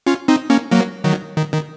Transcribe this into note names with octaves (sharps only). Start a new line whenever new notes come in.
C#4 F4
C4 D#4
A#3 C#4
F#3 A#3
D#3 F#3
D#3
D#3